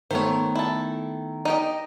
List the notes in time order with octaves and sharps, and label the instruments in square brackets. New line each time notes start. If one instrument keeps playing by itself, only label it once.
[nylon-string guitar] D#3 A3 B3 [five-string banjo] C5 C#5
[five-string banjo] E4 A4
D#4 G4 D#5